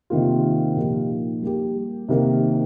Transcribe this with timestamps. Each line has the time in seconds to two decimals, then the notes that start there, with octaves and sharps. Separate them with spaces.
0.10 C3 D#3 A#3 F4
0.76 A#2 F3 D#4 G4
1.42 G3 A#3 G4
2.08 C3 D#3 A#3